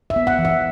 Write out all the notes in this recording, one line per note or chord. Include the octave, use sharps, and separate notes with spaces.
E5
B3
F#5
E3
E5